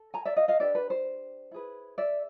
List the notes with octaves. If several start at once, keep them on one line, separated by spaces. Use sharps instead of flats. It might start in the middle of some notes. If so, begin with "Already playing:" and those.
Already playing: A4
G#5 A#5
D5 E5
D#5 F5
D#5 F5
D4 G4 B4 D5 E5
B4
C5
E4 G#4 B4
D5 E5